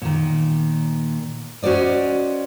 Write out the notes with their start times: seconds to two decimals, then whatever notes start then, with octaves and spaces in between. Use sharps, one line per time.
0.02 A#2 D#3
1.62 C#4 F#4 C5 D5 D#5